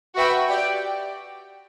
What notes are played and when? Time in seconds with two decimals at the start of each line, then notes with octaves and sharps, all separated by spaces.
0.15 F#4 B4 E5 G5
0.49 G4 D5 G5